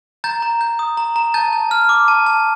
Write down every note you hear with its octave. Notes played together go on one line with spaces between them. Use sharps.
A#5 G6 A6
A#5
G6
D#6
A#5
A#5
A5 G6 A6
A5
F6
D6
A5
A5